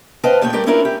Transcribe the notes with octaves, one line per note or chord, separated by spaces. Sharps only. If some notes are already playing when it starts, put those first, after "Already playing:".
B4 C5 D#5 F5 G5 A5
D#2 A#2 A3 C#5 G5
G3 A3 G4 A#4 D5
C#4 D4 E4 F4 A#4 C#5
G4